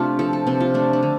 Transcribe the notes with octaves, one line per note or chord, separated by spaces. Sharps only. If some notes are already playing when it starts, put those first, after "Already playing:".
Already playing: C3 A3 C4 D4 F4
F3 A4
A4
C3 C4
F4
A3 D4
D4
D3